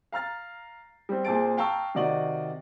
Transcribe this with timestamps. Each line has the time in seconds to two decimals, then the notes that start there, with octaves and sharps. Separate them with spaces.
0.12 F5 A#5 F6 A6
1.09 G3 C4
1.25 A#2 C4 G#4 A5 A6 D7
1.57 F5 G5 A5 A#5 C#6 E6
1.95 C3 D#3 F#4 D5 D#5 F#7